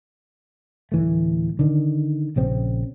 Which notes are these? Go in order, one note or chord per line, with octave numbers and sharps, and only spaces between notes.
D1 E3 A3
D3 D#3
A#1 C#3 C4